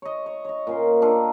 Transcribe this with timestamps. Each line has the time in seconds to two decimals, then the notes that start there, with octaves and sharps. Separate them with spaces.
0.02 C#5 D#5
0.26 C#5
0.45 C#5 D#5
0.67 A#2 C#4 C6
1.02 D4 F4 A4 A#4